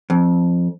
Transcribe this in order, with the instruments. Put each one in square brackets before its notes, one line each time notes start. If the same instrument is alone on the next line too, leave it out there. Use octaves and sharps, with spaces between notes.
[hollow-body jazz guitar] F2